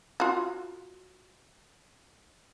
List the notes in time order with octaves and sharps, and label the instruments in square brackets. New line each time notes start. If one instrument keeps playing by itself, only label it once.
[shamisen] F4 F#4